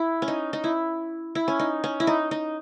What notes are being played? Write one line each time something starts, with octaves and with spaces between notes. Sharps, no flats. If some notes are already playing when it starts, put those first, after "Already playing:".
Already playing: E4
C#4
D#4
D#4
E4
E4
C#4
D#4
C#4
E4
D#4
D#4